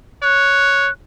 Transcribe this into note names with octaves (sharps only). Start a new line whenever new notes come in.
C#5 F#6